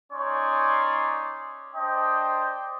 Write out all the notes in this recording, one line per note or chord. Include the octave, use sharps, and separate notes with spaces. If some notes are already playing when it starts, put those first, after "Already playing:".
C#4 D#4 C#5 D5 C6
D4 C5 D#5 G5